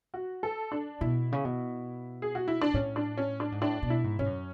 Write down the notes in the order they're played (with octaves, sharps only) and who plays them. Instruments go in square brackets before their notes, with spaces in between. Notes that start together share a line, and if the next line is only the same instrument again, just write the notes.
[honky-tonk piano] F#4
A4
D4
[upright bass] B2 [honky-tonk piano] E4
[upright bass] C#3
B2
[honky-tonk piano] G#4
F#4
E4
D4
[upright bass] A2 [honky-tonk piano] C#4
[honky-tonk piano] D4
C#4
D4
[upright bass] G#2
[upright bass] A2 [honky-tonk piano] D4
[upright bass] B2
[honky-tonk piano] E4
[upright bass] G#2
[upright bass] G#2 [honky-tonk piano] C#4
[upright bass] F#2